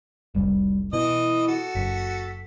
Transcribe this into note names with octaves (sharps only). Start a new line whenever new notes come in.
F1 C2 G3
B2 E3 E4 D#5
F#4 A4
F#1 B6